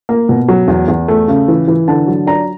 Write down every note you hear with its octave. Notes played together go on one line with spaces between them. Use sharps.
A#3
B2
F#3
E2
E2
A3
C#3
E3
E3
D3 A5
F#3
D4 A#5